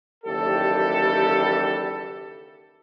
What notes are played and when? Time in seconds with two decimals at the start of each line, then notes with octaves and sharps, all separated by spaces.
0.25 F#1 D#2 E3 G3 G4 A4